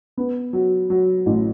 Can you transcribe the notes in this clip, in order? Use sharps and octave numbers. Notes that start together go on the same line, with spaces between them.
B3
F#3
F#3
A1